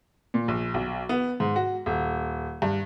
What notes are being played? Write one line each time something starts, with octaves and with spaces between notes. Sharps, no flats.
A#2
A#1
B1
B3
G#2
F#4
D#1
G2